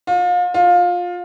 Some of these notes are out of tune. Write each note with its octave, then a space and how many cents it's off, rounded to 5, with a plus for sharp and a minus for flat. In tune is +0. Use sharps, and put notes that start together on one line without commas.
F4 +35
F4 +20